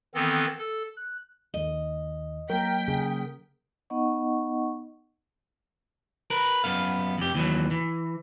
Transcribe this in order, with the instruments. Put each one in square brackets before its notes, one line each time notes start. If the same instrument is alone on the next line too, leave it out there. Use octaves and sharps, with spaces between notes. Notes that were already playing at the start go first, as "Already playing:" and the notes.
[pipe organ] D#3 E3 B3 C4 A4
A4
F#6
[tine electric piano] D#2 D#3 [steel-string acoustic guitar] D#5
[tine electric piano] F#3 A#3 [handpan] A#4 [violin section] G5 B6
[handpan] C#3 G#4
[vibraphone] B3 D#4 D#5 F#5 C#6
[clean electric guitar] A#4 B4
F#2 B3 F5
F2 G4
D#2 E3 F#3
E3